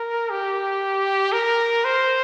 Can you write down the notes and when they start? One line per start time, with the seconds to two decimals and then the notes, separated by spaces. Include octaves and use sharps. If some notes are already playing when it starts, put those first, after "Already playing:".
Already playing: A#4
0.30 G4
1.32 A#4
1.85 C5